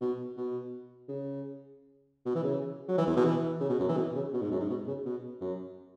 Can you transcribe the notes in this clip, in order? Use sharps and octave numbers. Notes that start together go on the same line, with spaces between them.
B2
B2
C#3
B2
E3
C#3
F#3
E3
E2
B2
E3
C#3
B2
F#2
E3
B2
C#3
B2
G#2
F#2
G#2
B2
C#3
B2
F#2